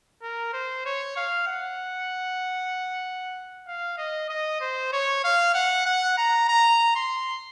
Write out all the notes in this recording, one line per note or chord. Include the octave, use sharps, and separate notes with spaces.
A#4
C5
C#5
F5
F#5
F5
D#5
D#5
C5
C#5
F5
F#5
F#5
A#5
A#5
C6